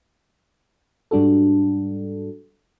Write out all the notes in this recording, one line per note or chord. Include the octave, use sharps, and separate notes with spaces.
G#2 G3 D4 F#4 A4